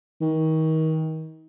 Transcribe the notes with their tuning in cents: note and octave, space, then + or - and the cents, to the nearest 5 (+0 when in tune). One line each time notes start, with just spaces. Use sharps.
D#3 +30